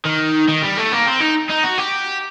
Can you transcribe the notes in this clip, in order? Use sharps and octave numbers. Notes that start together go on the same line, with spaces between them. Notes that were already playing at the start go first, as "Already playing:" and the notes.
D#3
D#3
G3
A3
A#3
C4
D#4
D#4
F#4
G4